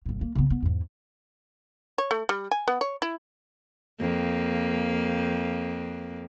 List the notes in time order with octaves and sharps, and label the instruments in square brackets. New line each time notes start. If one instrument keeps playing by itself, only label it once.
[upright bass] G1 A#2
A#3
C#3 B3
B3
E2 G#2
[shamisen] C#5
A3
G3
G#5
B3
C#5
E4
[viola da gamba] F2 A#3